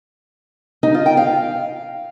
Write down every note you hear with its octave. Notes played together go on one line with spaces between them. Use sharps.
D#4
F4
G5
F5